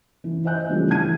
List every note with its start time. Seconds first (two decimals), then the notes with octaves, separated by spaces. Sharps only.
0.24 E3
0.45 C5 D#5 E5 G#5 F#6 G6
0.68 C#3 E3 F3 G3 A3 D4
0.90 E3 A5 G#6 D#7